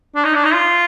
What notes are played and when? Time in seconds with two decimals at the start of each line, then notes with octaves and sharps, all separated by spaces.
0.16 D4
0.25 D#4
0.35 D4
0.45 D#4
0.54 F4